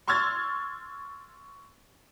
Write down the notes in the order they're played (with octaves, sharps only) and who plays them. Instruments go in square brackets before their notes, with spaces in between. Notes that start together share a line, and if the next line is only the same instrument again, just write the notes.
[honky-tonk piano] C6 C#6 E6 F6 G#6 A6